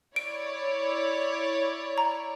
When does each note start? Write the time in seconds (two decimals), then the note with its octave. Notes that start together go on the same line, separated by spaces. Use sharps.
0.16 E4 C#5 D5 D7
1.98 A#5